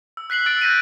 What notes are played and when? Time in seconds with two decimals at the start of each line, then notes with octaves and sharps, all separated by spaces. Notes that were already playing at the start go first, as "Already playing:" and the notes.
0.17 E6
0.30 F#6 B6 C7 F#7
0.46 E6 A6 D7
0.61 F#6 G6 A#6 B6 D7 D#7